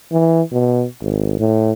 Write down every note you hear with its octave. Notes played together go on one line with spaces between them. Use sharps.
E3
B2
G#1
A2